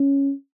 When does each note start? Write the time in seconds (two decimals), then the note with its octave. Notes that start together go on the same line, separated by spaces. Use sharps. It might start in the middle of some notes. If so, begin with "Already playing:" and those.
Already playing: C#4